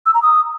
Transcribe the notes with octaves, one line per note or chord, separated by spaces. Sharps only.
E6
A#5
D#6